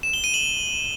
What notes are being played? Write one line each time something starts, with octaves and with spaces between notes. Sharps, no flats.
E7
G7
D#7
F#7